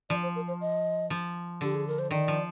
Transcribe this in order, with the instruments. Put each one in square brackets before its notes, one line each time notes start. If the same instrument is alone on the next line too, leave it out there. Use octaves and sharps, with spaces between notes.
[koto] F3 [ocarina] D5
[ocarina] C5
A#4
C5
D#5
[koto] F3
[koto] D3 [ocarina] G4
[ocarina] G#4
A#4
C5
[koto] D#3 [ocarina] D5
[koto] F3